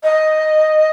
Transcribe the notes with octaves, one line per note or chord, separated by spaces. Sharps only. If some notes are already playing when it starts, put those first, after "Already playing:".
D#5